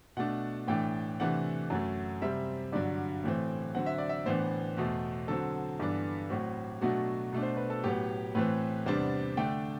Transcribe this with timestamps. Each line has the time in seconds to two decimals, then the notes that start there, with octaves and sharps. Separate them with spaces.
0.17 B2 A3 D4 F#5
0.68 A2 E3 A3 D4 G5
1.20 C3 E3 A3 D4 F#5
1.70 F#2 F#3 A3
2.22 C3 G3 C4 E5
2.72 G2 D3 F#3 D5
3.24 A2 E3 A3 C4
3.75 D3 F#3 C4 F#5
3.86 E5
3.98 D5
4.09 E5
4.26 A2 E3 B3 D4 C5
4.77 E2 B2 A3
5.28 D3 F#3 C4 A4
5.80 G2 E3 B3 D4
6.30 A2 F#3 C4 F#4
6.81 B2 F#3 A3 D4 F#4
7.32 B2 A3 D4
7.43 C5
7.57 B4
7.70 A4
7.84 A2 F#3 B3 G4
8.35 A2 E3 A3 C4 B4
8.86 E2 C3 G3 B3 D4 C5
9.37 D3 A3 D4 G5